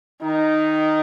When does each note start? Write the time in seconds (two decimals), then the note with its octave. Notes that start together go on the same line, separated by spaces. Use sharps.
0.22 D#3 D#4